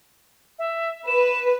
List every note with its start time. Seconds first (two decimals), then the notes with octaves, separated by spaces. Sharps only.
0.59 E5
1.07 B4 E7